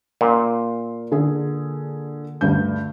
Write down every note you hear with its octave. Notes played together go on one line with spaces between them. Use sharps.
A#2 A#4 C6
D3 G#4
D2 G2 G6